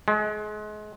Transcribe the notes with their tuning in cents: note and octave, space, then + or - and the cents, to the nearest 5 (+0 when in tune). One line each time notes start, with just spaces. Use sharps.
G#3 +30